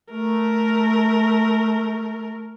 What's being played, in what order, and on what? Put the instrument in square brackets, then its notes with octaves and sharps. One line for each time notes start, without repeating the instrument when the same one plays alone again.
[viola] A3 A#4